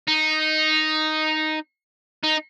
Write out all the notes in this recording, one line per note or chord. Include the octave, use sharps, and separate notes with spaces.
D#4
D#4